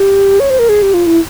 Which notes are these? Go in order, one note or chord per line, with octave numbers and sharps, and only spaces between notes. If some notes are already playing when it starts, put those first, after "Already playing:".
Already playing: G4
C#5
C5
A#4
G#4
G4
F4
E4